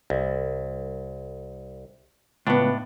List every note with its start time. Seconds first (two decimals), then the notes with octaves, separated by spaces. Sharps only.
0.10 C2
2.47 C#2 A2 B3 D4